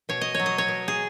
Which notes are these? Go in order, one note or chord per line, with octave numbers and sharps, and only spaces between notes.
B2 C#5
D#5
F#3 C#5
D#5
C#5
B2
G#4